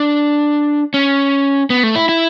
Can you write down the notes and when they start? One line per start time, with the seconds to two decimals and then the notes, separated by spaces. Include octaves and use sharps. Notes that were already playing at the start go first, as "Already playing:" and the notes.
Already playing: D4
0.94 C#4
1.70 B3
1.83 A3
1.96 E4
2.09 E4